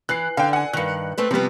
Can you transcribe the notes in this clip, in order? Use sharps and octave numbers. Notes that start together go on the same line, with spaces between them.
E3 F#6 C7
D3 F5 G5
F#5 G#5
G2 D#3 F#6 C#7
A3 C4 B4
C3 F3 G3 B3